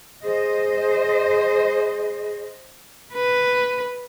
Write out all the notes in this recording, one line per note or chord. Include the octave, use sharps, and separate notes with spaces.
G#4 C5 D#5
B4